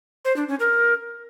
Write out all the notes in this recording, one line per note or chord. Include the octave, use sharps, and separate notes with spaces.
C5
D4
C#4
A#4